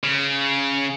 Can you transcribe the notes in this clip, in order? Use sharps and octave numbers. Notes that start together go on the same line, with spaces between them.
C#3